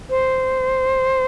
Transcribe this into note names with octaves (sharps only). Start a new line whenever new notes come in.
C5